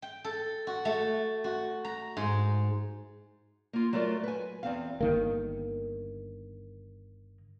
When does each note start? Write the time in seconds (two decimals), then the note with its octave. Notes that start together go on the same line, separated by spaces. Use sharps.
0.02 G5
0.24 A4
0.67 F#4
0.85 A3
1.44 F#4
1.85 A#5
2.17 G#2
3.73 A#3 F4
3.93 F#3 A3 F4 A#4 D5
4.24 B4 G#5
4.63 E2 C4 F5
5.01 G1 D#3 A#3